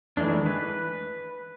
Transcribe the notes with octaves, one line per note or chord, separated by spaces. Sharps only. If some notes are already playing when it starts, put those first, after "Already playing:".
D#3 E3 G#3 A3 D4
B4